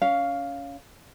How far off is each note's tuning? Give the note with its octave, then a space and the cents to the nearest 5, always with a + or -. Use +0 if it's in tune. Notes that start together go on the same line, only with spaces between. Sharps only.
C#4 +20 F5 +0